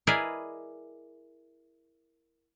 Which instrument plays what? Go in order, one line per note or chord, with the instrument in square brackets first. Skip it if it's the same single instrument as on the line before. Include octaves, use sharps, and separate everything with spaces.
[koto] E4 G#4 A#4 B4 D5 D#5